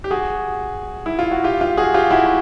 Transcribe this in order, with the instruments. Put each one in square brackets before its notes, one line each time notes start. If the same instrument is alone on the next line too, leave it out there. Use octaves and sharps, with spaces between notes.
[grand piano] G4
F#4 G#4
E4
F4
F#4
F4 G4
F4 G4
F#4 G#4
F4 G4
E4 F#4
F#4